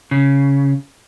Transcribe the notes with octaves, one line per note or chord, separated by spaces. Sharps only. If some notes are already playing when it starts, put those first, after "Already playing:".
C#3